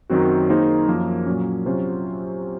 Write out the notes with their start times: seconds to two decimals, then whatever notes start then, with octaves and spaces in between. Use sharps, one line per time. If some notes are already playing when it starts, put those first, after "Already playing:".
0.10 F#2 D#3 F#3 C4 F#4
0.49 D#3 A#3 D#4 G#4 C5
0.88 F#2 F3 A#3
1.26 A#2 F#3 C#4
1.66 C3 F#3 C#4 F4 C5